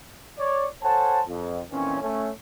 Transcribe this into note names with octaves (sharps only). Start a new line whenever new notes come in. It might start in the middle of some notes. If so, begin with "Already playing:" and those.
C#5 D5
A4 C5 C#5 F#5 G#5 A5
F2
F2 A#2 D#3 E3 C4 C#4
A3 C#4